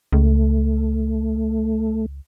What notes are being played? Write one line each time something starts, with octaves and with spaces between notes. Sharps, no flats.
C#2 A3